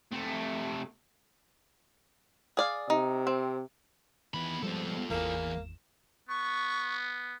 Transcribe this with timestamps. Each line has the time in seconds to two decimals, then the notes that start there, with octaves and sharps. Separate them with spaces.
0.12 C3 A3
2.57 G#4 D5 F5
2.90 C3 D#4
3.27 C4
4.34 D#3 E3 B3 B5
4.63 F3 G3 G#3 B3 F4 A4 C5
5.10 G#1 E2 E3 A#3 G#4 E7
6.29 B3 C#6